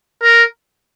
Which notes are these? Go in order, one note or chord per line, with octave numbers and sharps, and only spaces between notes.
A#4